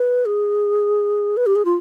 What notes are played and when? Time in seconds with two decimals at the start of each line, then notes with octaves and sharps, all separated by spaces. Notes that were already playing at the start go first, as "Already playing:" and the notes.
Already playing: B4
0.26 G#4
1.37 B4
1.46 G4
1.56 G#4
1.65 F4